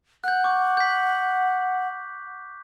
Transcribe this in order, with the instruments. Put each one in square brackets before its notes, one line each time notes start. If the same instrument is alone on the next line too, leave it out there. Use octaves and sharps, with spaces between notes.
[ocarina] F#5 [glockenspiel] F#6 G6
[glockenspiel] C#6 D6 G6
G6 B6